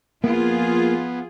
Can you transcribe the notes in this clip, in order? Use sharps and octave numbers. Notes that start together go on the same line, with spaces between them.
F3 A#3 B3 F4 G#4